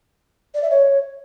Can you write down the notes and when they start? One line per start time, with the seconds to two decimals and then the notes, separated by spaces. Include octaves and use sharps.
0.55 D5
0.63 E5
0.71 C#5